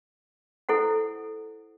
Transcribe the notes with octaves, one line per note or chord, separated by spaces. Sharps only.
E4 A4 C5 F#5